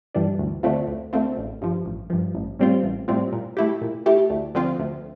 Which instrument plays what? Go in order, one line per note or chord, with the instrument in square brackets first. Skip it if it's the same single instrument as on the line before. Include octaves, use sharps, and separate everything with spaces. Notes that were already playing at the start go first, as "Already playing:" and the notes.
[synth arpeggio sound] G2 E3 G3 D4
D2
D3 A3 C4 F4
D2
D3 A3 C4 F4
A1
G2 F3
A1
G2 F3
A1
A2 G3 C4 F4
A1
A2 G3 C4 F4
A#2
A3 E4 G4
A#2
A3 E4 G4
D2
D3 F3 C4 F4
D2